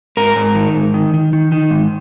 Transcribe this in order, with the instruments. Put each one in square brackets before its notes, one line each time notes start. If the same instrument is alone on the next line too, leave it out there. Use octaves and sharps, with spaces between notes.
[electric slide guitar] G#2 A#4
G#2
D#3
G#2
D#3
D#3
D#3
D#3
G#2